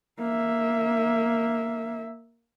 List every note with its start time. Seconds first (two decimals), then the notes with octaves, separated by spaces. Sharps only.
0.19 A#3 E5